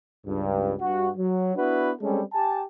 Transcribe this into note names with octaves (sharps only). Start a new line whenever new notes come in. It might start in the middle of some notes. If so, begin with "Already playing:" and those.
C#2 G2
G2 F#4
F#3
B3 D4 E4 F#4 B4
G3 G#3 C4 C#4 A4
G4 G#5 A5